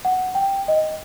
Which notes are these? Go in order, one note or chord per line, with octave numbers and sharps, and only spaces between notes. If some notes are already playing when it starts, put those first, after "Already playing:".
F#5
G5
D#5